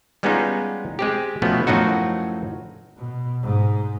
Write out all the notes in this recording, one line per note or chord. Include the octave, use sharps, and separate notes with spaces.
G3 G#3 B3 C#4 D#4 F4
G#3 C4 G4
B2 F3 A3 B3 C#4
F#2 A2 F3 F#3 D#4 F#4
B2
G#2